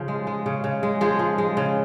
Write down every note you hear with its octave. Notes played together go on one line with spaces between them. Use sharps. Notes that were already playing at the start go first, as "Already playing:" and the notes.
Already playing: C#3 F3
G#3
G#3
C#3
C#3
G#3
F3 G#3 G#4
F3
G#3
C#3